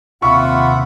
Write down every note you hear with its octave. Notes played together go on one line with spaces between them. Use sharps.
D#2 C3 F4 E5 F#5 B5 C#6